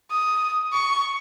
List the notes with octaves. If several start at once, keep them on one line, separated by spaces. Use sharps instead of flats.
D#6
C#6